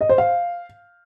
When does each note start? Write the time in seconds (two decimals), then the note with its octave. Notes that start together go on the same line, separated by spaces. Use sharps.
0.01 D#5
0.09 C5
0.18 F5